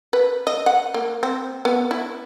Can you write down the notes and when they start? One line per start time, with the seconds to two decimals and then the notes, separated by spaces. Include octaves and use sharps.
0.13 B4
0.47 D#5
0.66 F#5
0.94 A#3
1.23 C4
1.65 B3
1.91 E4